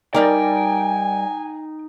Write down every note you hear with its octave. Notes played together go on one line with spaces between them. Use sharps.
G3 D#4 A#4 D5 G5 G#5